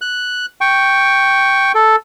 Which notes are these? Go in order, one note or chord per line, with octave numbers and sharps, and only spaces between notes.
F#6
G5 C#6
A4